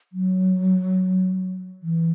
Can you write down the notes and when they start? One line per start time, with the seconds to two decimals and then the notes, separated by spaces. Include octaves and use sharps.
0.12 F#3
1.82 E3